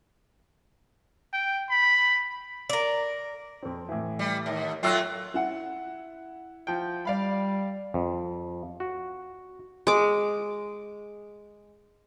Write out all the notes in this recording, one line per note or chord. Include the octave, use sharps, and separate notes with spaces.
G5
B5
A#4 D5
F2 C4
A2 E3
G3
D#2
F#3 A3 F4 G5 E6 F#6
E4 F#5
F3 G5
G3 D5 F5 B5
F2
F#4
G#3 D6